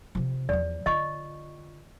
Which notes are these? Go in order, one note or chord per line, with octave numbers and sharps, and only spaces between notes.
C3 F3
E2 F3 D5
D3 F4 D#5 C#6